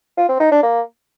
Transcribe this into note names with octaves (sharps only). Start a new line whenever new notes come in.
F4
C4
D#4
D4
A#3